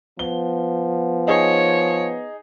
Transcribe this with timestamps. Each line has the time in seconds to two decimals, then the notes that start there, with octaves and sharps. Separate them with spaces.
0.19 F3 B3 G7
1.28 D#4 G#4 C#5